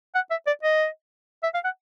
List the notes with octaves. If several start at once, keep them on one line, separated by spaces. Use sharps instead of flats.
F#5
E5
D5
D#5
E5
F5
F#5